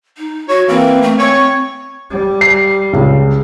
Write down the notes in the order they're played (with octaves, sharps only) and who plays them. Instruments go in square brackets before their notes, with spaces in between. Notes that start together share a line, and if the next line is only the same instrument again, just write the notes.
[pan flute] D#4
[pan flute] F#4 [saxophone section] C#5
[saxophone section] E3 A#3 [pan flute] C4
[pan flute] A3
[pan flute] C4 [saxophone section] C#5
[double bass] G3
[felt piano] C7
C#2